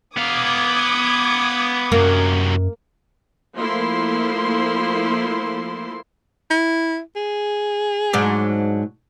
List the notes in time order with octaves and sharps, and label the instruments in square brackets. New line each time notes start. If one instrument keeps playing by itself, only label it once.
[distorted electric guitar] B3 F5 [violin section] D6 D#6 G#6
[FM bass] F#2 [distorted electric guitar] C3 F#3 [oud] A#3
[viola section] F3 A3 A#3 E4 C6
[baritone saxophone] E4
G#4
[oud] G#2 F#3 D4